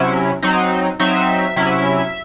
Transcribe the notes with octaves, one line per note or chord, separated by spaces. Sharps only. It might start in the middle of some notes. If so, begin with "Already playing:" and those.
Already playing: C3 F#3 C#4 E4
F#3 C4 D#4
F#3 C4 D#4 E5
C3 F#3 C#4 E4